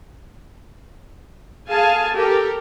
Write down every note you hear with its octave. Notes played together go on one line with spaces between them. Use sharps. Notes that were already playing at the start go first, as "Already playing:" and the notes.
G#4 A4 F5 G#5 A5
G4 A4 A#4